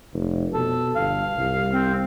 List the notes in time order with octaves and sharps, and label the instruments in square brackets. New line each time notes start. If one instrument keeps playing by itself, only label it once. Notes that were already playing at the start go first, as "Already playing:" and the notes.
[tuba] F1
[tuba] B2 [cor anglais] A4
[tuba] G1 [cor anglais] F5
[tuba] C2
[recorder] C4